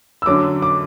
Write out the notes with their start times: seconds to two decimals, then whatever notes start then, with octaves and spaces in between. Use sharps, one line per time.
0.22 E6
0.26 F#2 D3 F#3 D6
0.62 D6